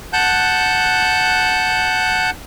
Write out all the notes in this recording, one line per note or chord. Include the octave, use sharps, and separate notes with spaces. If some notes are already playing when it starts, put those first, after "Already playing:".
F#5 A5 F#6 G6